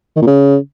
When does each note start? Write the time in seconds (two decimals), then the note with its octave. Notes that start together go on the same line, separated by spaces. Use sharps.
0.17 D#3
0.22 A#2
0.27 C#3